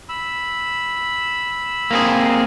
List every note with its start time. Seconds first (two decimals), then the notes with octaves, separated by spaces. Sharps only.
0.09 B5 E6
1.91 A#3 C4 G#4